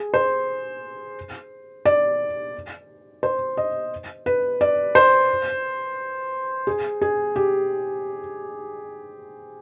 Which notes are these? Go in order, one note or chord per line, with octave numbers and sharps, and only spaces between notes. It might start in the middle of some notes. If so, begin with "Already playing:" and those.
Already playing: G#4
C5
D5
C5
D#5
B4
D5
C5
G#4
G#4
G4